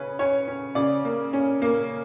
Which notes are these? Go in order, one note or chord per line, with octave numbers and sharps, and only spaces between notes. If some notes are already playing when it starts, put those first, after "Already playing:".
Already playing: C#3 C#4 B4
C#4 C#5
C#4
C#3 D5
A#3
C#4
A#3